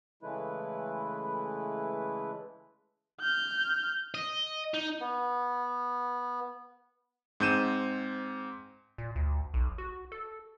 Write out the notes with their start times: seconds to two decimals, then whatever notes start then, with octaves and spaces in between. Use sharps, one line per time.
0.23 C#3 E3 G#3 A3 E4 B4
3.21 F6 G6
4.14 D#5
4.74 D#4
5.00 B3
7.40 G#2 C4 G6 D#7 E7
8.98 A#2
9.16 D2
9.54 B1
9.78 F#4
10.12 A4